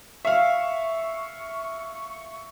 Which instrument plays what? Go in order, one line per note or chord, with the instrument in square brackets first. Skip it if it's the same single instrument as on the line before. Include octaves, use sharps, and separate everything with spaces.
[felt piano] E5 F5 [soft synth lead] C#6